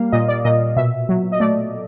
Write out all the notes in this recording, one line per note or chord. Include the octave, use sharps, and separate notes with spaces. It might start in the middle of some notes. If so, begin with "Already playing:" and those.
Already playing: G3 A#3 F5
A#2 D#5
D5
A#2 D#5
B2 E5
F#3
D#5
A3 D5